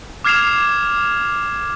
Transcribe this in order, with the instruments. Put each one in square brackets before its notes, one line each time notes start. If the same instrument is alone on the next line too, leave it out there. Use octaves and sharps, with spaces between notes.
[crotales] D6 F6 G#6 C7 E7 F7